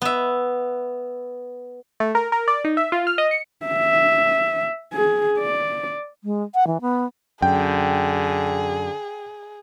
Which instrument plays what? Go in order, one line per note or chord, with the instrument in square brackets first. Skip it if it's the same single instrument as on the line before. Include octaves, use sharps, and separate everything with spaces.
[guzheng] B3 E5
[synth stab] A3
A#4
A#4
D5
D#4
E5
F4
F6
D#5
C#7
[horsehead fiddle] E5
G#4
D5
[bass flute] G#3
F#5
E3
B3
[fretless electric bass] F#2 [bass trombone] D3 [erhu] G#4 [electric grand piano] G5